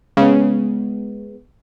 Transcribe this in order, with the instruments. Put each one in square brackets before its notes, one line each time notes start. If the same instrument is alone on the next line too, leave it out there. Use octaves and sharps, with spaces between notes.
[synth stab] C#3 [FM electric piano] G#3 B3